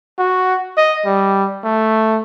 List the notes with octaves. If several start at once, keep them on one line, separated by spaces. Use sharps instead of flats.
F#4
D#5
G3
A3